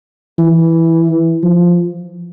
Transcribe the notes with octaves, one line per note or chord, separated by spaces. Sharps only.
E3
F3